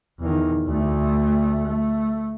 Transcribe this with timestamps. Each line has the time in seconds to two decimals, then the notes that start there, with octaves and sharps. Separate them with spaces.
0.20 E2 D#3
0.66 D2 A3
1.66 A3